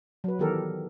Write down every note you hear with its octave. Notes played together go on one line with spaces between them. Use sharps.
F#3 B4
D#3 E3 B3 G4 A4 A#4